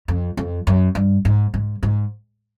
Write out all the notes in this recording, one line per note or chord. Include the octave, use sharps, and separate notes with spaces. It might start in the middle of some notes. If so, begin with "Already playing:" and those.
F2
F2
F#2
G2
G#2
G#2
G#2